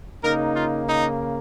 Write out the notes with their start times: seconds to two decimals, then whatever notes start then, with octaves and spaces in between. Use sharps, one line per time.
0.23 C#3 A#3 D#4 A#4
0.56 F4
0.88 D#4